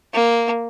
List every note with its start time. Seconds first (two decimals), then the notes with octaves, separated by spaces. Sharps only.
0.13 A#3